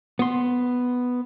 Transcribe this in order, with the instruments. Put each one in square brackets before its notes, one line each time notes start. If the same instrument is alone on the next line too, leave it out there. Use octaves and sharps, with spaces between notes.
[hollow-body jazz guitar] B3 C6